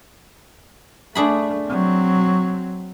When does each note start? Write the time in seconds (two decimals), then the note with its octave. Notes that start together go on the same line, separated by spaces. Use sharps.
1.15 A3 D4 G#4 B5
1.67 F#3 C4